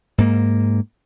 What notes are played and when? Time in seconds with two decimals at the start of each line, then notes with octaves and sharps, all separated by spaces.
0.18 G#2 A#3